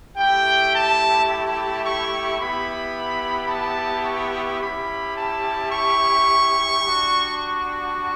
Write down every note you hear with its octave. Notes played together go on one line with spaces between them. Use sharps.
A3 E4 G4 G5
A5
A5
C#6
B3 E4 G4 B5
A5
C#6
C#4 E4 G4 B5
A5
C#6
G3 D4 F#4
C#6